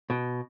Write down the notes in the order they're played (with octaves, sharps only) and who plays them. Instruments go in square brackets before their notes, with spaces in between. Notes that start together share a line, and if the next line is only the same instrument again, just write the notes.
[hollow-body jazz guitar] B2